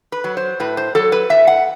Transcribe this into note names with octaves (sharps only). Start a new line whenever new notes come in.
B4
F#3
C5
A2 B4
C5
F#3 A4
B4
A2 E5
F#5